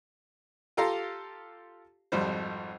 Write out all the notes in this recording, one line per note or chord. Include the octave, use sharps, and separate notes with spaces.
F4 G4 A4 F5 A#5 C6
G#1 F2 G3 C5